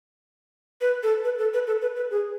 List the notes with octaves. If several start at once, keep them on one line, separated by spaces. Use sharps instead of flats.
B4
A4
B4
A4
B4
A4
B4
B4
G#4